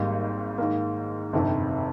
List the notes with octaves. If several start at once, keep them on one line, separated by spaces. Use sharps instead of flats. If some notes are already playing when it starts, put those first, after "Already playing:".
Already playing: G#1 G#2 G3 A#3 D#4
G#2 D#3 A#3
G1 F2 C3 D#3